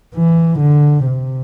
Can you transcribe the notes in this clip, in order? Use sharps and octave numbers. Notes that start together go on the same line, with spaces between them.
E3
D3
C3